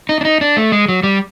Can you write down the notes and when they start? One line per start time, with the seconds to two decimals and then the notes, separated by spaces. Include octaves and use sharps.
0.09 D#4
0.21 D4
0.25 D#4
0.41 D4
0.57 A3
0.72 G#3
0.88 F#3
1.03 G3